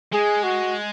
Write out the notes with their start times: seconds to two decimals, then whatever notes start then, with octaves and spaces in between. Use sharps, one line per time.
0.13 G#3 G#4
0.44 F#4